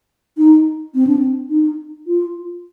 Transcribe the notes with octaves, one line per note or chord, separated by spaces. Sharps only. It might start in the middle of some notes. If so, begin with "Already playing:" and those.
D#4
C4
D4
C4
D#4
F4